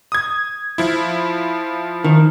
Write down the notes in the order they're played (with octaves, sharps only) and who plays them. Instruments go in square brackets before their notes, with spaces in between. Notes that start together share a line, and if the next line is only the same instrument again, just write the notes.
[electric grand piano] D#6 G#6
F3 E4
[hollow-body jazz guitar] D#3